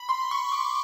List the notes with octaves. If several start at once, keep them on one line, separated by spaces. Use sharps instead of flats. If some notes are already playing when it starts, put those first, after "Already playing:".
Already playing: B5
C6
C#6
D6